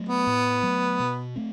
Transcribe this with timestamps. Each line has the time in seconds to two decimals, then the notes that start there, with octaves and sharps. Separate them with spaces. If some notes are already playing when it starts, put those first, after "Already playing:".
Already playing: F#3 A3
0.09 B3
0.27 A2
0.63 F#3 A3
1.00 B2
1.36 A3 C4